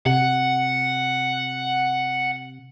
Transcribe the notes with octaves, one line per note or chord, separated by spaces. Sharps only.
C3 F#5